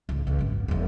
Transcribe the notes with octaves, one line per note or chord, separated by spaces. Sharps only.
C#2 A2
C#2 A#2
G#1 F#2
D#1 E2